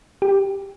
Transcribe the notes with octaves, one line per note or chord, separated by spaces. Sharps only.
G4